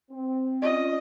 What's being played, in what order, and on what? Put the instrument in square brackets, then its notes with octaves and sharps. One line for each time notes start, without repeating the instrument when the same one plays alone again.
[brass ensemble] C4
[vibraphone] C#4 F4 D5 [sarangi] D#5